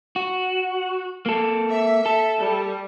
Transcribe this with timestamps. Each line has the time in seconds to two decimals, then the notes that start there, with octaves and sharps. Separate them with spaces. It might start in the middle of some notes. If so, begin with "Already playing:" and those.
0.16 F#4
1.26 A#3 A4
1.70 E5
2.06 A4
2.41 G3